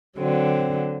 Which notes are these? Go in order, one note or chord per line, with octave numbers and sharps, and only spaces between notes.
D3 F#3 C4